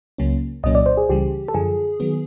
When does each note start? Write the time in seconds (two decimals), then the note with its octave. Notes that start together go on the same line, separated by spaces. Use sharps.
0.18 C#2 C#3 F#3 A#3 C#4
0.63 C2 A#2 F#3 A#3 C#4 D#5
0.75 D5
0.86 C5
0.97 G#4
1.09 C#2 C#3 E3 G3 G4
1.48 A4
1.54 F#2 D3 F3 G#4
2.00 D#3 F#3 B3